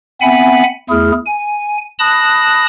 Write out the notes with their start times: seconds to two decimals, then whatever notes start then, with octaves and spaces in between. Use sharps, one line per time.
0.21 B3 C4 E5 F#5 G#5 B5
0.90 E2 A3 E4 G#4 F6
1.26 G#5
1.99 A5 B5 D#6 F#6 A#6